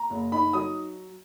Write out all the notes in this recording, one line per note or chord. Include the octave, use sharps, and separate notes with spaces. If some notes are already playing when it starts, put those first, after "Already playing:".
Already playing: A#5
F#1
D#4 B5
F#3 D#6